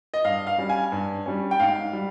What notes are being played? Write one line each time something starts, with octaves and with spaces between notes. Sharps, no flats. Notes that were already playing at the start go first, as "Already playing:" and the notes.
D#5
G2 F5
F5
G3 C#4
G#5
G2
G3 C#4
G5
G#2 F5
G3